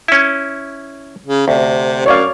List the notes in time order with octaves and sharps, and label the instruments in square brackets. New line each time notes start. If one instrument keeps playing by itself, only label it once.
[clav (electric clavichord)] C#4 E4
[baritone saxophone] C#3
[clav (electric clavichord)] D2 [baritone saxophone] C3
[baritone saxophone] F#2 [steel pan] C#5 D5 F5